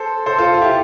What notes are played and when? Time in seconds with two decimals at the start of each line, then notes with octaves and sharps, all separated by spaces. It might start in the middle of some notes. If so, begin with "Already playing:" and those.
Already playing: A4 C5
0.26 A4 C5
0.38 F4 A4
0.54 F4
0.62 E4 G4